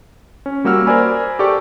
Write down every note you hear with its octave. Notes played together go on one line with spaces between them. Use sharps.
C#4
G3 A#3 F#4 E6 F6
A#4 C5 D5 G#5 B5
G4 A4 D5 C#6